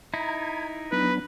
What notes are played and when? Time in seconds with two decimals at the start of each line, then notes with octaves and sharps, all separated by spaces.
0.14 D#4 E4 A#5 G#6
0.92 F#3 B3 D4 B4